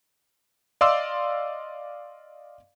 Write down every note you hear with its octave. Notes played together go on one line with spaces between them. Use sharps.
D5 D#5 F5 C6 D6 E6